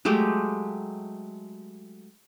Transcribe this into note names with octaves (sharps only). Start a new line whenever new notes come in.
F#3 G#3 A3 G4